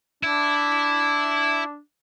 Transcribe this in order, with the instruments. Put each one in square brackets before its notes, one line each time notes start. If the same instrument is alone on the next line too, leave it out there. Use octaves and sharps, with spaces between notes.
[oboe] D4 [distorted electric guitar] E4